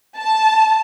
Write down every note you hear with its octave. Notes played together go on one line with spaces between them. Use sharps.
A5